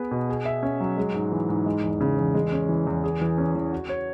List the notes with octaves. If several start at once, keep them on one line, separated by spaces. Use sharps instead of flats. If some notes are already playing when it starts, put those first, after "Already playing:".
Already playing: B3 G#4 B4
B2
G#4
E5
C#4
F#3
G#3
G#2
E3
G#2
G#3
E2
C#3
E2
G#3
C#4
E3
E2
G#4
E3
C#4
E3
F#4
C#5